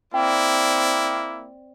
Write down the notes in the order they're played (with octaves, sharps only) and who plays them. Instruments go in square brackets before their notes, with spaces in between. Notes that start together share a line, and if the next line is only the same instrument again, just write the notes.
[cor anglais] A#3 [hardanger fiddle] C4 D5 [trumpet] E4 [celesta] G5